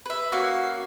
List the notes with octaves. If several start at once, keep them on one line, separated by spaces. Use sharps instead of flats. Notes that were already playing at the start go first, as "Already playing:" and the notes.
B4 E5
A#3 C#4 F#4 F5